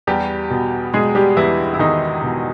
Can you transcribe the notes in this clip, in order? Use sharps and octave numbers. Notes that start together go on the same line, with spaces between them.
E2 G3 G4
B2
B2 G#3 G#4
G3 G4
E2 E3 E4
E4
E2 D#3 D#4
B2